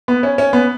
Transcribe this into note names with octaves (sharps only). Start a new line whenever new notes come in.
B3
C#4
C#4
B3